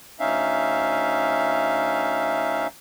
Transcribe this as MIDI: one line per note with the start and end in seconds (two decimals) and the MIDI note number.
0.20 2.67 38
0.20 2.67 61
0.20 2.67 63
0.20 2.67 76
0.20 2.67 77